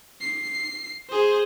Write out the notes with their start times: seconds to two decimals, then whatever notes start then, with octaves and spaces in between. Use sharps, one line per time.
0.21 C7
1.09 G#4 C5